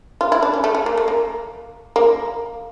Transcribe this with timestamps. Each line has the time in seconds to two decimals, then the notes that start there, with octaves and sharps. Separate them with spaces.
0.21 F4
0.32 E4
0.43 D4
0.54 C#4
0.64 A3
0.75 A3
0.86 A#3
0.98 A3
1.08 A#3
1.96 A#3